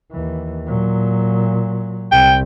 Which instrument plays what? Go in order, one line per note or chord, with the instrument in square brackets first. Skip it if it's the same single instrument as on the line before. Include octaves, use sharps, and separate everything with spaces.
[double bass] D#2 E3
A#2 F#3
[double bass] C2 [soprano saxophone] G5